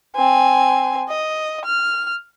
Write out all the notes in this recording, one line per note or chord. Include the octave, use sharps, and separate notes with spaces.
C4 G#5
D#5
F6